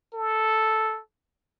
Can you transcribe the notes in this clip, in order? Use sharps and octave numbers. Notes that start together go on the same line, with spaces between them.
A4